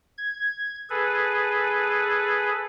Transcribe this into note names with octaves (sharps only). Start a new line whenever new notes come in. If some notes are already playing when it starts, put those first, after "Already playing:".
G#6
G#4 A4 B4